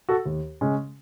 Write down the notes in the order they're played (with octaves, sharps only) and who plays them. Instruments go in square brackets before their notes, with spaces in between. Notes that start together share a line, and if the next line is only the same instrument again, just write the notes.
[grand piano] F#4 A4
D#2
C#3 G#3 C#4